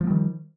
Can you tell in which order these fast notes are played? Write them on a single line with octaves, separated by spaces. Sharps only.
F3 A#3 G3 D#3